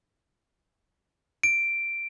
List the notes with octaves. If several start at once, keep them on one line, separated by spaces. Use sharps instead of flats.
D7